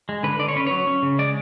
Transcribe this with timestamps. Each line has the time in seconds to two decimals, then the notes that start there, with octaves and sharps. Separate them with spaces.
0.09 G#3
0.23 D3 B4
0.39 D3 D5
0.48 C#5
0.56 C#4 B4
0.67 F#3 C#5
0.87 C#4
1.03 C#3
1.19 G#3 D5